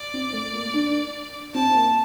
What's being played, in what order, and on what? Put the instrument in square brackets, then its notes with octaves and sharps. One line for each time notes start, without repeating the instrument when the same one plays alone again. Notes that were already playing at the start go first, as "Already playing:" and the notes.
Already playing: [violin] D5
[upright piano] C4
A3
A#3
D4
[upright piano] C4 [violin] A5
[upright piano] A#3